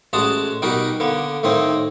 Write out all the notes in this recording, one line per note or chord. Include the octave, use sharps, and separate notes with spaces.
A1 G#3 F#4 A5 D#6
B2 G3 D#4 F#4 A#4
D3 A#3 B3
A2 D#3 A#3 C4 D#4